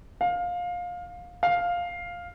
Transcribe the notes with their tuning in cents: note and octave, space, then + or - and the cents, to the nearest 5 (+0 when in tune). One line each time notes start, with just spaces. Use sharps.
F5 +20
F5 +5